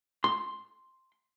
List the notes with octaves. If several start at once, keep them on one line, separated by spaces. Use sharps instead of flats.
C6